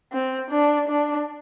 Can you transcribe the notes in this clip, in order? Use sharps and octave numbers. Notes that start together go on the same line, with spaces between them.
C4
D4
D4